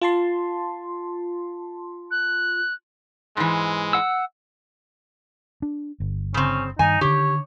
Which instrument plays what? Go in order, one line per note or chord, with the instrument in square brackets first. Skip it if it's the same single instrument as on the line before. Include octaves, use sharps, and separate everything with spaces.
[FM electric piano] F4 A5 C6
[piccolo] F#6
[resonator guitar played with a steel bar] G#2 E3 [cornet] G#3
[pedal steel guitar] F#5 E6
[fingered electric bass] D4
G1
[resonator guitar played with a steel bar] C#3 C4 [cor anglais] C#4
[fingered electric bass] G2 D#3 [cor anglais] D#4 [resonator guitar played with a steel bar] G#5
[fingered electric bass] D3 D#3 [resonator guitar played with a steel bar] G4 [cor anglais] C#5